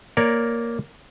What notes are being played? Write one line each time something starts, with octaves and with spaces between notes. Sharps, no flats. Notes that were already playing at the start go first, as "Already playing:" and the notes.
A#3 A#4 C#5 D5